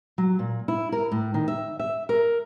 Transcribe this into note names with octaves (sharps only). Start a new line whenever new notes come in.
F#3
A#2
E4
A#4
A2
D#3
E5
E5
A#4